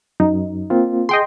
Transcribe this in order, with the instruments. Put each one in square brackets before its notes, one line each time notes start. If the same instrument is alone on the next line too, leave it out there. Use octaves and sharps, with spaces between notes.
[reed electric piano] F#2 [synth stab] D#4
[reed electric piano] A#3 C4 F4
[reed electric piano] G#4 [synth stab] D#5 G5 C6